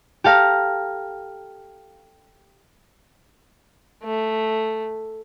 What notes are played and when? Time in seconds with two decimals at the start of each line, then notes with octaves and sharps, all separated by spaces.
0.24 G4 A4 F5 A#5
4.04 A3